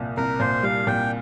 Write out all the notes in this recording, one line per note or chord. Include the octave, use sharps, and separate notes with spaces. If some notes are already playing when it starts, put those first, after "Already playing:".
Already playing: C2 A#2
C2 A#4
A#2 C5
G3 F5
A#2 G5